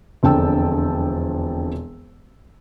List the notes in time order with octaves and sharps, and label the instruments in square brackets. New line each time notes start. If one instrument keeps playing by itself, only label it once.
[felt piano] E1 F2 D3 G5 A5 E6